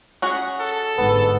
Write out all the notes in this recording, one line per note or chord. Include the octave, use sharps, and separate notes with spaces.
C#4 F#4 G#4
A4
G1 G#2 B3